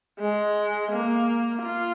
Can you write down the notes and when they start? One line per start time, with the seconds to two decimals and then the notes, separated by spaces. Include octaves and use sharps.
0.19 G#3
0.91 A#3
1.62 F4